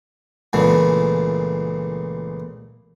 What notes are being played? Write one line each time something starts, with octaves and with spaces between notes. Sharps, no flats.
C#2 A#2 C#3 E3 A3